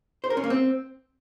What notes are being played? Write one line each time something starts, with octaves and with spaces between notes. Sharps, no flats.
C5
A#4
C#4
A#3
C4